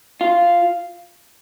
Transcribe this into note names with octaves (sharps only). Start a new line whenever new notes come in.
F4